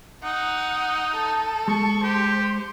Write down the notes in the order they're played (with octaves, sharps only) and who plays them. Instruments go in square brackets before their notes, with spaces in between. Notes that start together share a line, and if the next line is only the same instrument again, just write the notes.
[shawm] D#4 [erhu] F#5
[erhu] A4
[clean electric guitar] G#3 [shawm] C#6
[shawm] G4 [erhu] C5